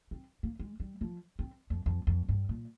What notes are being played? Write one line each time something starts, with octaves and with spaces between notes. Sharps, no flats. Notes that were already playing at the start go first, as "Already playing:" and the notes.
C4
A#3
G#3
G3
F3
C4
F2
F2
F2
G2
A#2